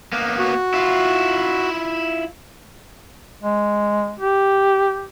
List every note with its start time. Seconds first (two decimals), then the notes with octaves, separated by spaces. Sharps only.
0.13 A#3 B3
0.39 F#4
0.74 E4 F4
3.43 G#3
4.20 G4